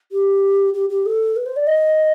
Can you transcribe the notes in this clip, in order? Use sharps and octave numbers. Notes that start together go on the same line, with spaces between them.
G4
G4
G4
A4
B4
C5
D5
D#5